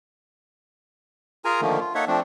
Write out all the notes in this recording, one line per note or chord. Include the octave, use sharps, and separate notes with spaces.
F4 G#4 A#4 G#5 A#5
D3 D#3 F3 A3 A#3
F4
A#3 D#4 A4 C#5 E5 F#5
F3 A3 C4 D4